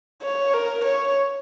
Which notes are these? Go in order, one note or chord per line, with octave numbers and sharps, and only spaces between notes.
C#5
A#4
C#5